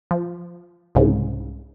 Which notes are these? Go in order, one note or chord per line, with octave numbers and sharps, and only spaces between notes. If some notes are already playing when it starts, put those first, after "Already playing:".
F3
C2 G#2 C#3